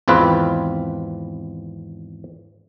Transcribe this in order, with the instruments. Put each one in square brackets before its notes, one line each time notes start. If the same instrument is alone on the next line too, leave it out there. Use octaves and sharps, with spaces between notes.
[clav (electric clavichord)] G#1 E2 C4 F4 B4